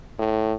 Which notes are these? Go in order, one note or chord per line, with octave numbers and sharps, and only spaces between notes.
A2